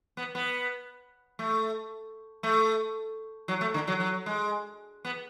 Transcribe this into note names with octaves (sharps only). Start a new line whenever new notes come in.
B3
B3
A3
A3
F#3
A3
D3
F#3
F#3
G#3
B3